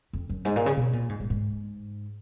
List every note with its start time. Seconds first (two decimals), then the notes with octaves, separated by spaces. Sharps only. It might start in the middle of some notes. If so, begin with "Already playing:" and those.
0.13 F2
0.29 F#2
0.45 G#2
0.56 A#2
0.66 C#3
0.77 B2
0.93 A#2
1.09 G#2
1.20 G#2
1.30 G#2